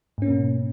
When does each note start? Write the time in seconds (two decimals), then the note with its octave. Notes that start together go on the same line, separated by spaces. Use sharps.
0.18 G#2
0.22 C#4
0.26 A#3
0.30 B2